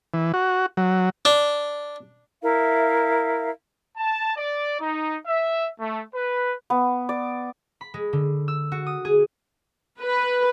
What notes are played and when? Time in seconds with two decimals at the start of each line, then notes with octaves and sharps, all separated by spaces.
0.14 E3
0.34 F#4
0.77 F#3
1.25 D4
2.42 E4 A#4 E5 F5
3.97 A5
4.37 D5
4.80 D#4
5.26 E5
5.79 A3
6.13 B4
6.70 B3
7.09 D5
7.81 B5
7.94 G#3
8.13 D3
8.48 E6
8.72 F#4
8.86 D#6
9.05 G#4
10.01 B4